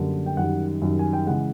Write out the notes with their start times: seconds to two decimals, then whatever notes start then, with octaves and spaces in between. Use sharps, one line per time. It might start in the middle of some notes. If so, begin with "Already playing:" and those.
Already playing: F#2 D3 G3 A#3
0.26 G5
0.37 F#2 D#3 G3 F#5
0.82 F#2 D#3 G3
0.99 G#5
1.13 G5
1.27 C#3 E3 G#3 F#5